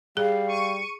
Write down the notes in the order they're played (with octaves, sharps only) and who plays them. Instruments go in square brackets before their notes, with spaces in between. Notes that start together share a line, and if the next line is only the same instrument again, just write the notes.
[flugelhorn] G3 [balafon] G#4 [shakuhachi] F5
[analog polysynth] C#6 C#7 D#7